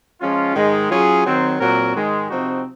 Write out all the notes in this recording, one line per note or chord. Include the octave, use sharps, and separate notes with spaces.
F3 G#3 C#4 F4
G#2 D#3 G#3
F#3 C#4 F4 G#4
D#3 F#3 C4
A#2 F#3 C4 F#4 A#4
G#2 D#3 G#3
C3 F3 C4 D#4 F#4